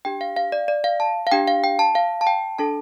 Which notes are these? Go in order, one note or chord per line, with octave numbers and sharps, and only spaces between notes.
D4 G4 G5
F5
F5
D5
D5
F5
A5
F5
D4 G4 G5
F5
G5
A5
F5
A5
G5
D4 A4 A5